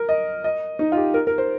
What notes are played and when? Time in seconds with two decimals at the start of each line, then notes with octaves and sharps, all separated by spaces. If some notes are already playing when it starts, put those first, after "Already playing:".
Already playing: A#4
0.09 D#5
0.44 D#5
0.79 D#4
0.92 F4
0.97 G4
1.14 A#4
1.27 A#4
1.38 C5